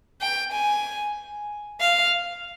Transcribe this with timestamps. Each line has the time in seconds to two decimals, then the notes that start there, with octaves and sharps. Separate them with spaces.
0.21 G5
0.52 G#5
1.80 F5